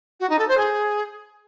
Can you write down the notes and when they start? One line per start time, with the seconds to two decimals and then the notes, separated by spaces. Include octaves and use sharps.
0.20 F#4
0.29 D#4
0.39 A4
0.48 C5
0.57 G#4